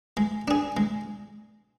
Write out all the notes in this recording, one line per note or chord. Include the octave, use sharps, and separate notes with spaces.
G#3
D4 G#4
G#3